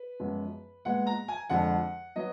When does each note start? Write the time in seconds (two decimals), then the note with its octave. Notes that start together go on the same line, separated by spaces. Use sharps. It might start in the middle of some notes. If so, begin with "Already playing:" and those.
Already playing: B4
0.19 F#2 F3 G#3 B3
0.85 A#2 G#3 B3 F#5
1.07 A#5
1.28 G#5
1.49 F2 D3 F3 G#3 F#5
2.16 F#3 B3 D#5